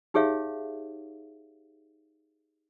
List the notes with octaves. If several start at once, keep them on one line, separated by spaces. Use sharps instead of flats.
D#4 G4 G#4 C#5 E5 F5